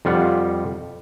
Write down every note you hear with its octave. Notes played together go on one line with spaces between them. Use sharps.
F2 G3 F4 F#5